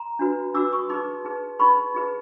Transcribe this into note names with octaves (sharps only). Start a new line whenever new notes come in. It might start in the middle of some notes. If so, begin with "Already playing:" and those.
Already playing: A#5 C6
D4 F#4 B4
D4 F#4 B4 D6 E6
C#6 D#6
D#4 G#4 B4 C6 D6
D#4 G#4 B4
D#4 G#4 B4 B5 C#6
D#4 G#4 B4